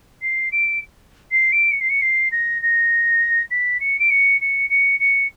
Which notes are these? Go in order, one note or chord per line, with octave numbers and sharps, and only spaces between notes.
C7
D7
C7
D7
C#7
C7
C#7
C7
A#6
A#6
B6
C#7
D7
C#7
C#7
C#7
C#7